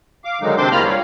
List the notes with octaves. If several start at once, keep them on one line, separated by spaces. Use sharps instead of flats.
F5 D6
D3 D#3 F#3 G#3 D#4
C3 C4 D4 C5 C6 D6
E2 A#3 F4 A#5 B5 F6
G3 C#5 F5